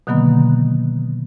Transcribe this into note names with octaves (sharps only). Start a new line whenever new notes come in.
B2 D3 D#3 F#3 A#3 B3